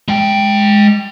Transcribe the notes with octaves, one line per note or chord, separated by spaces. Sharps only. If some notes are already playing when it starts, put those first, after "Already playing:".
G#3 G5